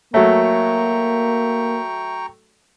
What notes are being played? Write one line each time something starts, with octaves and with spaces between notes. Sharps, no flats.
F#3 A3 A#3 C#5 E5 G5 A#5 C#6